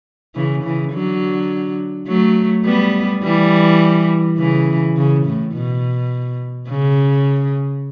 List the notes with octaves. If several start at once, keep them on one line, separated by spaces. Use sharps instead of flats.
C#3 E3
C#3 E3
D3 F#3
F#3 A3
G3 B3
E3 G3
C#3 E3
C#3
A2
B2
C#3